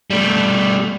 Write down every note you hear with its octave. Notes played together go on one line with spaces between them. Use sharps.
G3 A3